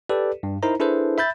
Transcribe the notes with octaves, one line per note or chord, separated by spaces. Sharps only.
G4 A4 B4 D5
G2
D#4 E4 A#4 C5 A#5
D4 E4 G#4 A4 B4 C5
E5 B5 G6 A6